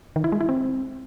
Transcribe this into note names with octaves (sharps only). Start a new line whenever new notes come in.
D#3
E4
G#3
E4
C4